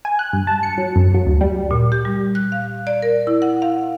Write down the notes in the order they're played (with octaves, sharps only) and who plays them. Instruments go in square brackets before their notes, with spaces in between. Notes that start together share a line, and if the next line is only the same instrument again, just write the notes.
[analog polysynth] G#5
F#6
G2
A5
C#7
F#3
F#2
F#3
D2
G3
[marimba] A#2
G4
G3
F#6
F5
D5
A#4
E4
F#5
F5